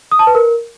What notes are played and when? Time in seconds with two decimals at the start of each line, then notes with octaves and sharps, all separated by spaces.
0.12 D#6
0.19 A5
0.27 B4
0.35 A#4